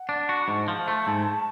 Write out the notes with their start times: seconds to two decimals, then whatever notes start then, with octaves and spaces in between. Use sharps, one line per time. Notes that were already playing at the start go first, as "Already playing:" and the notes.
Already playing: F#5
0.09 D4
0.29 F#4
0.40 B5
0.48 G#2 A5
0.68 F3
0.88 A3
1.07 G#2